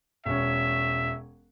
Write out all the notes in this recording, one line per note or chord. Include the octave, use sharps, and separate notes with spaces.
E1 C#4 E5